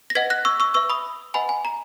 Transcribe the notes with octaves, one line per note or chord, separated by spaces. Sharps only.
A#6
B4 D#5 F#5 G#6 B6
F#6 A#6
C#6 E6
C#6 E6
B4 E5 C#6 E6
B5 D#6
B4 D#5 F#5 G#5 B5
G#5
A#5